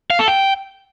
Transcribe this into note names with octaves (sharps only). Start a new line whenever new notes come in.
F5
A4
G5